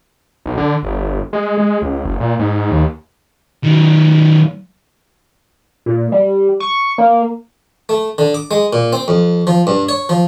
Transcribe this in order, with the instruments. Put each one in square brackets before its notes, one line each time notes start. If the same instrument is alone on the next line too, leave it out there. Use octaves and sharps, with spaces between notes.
[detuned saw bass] B1
D3
G1
G#3
G#3
C#2
F#1
A#2
G#2
D#2
[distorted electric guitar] D#3 F#3
[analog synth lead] A#2
G3
C#6
A#3
[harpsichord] A3
D3
D6
G#3
A#2
C4
F2
F3
G2
C#5
F3